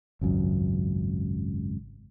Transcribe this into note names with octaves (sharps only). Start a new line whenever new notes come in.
G#1 C#2 F#2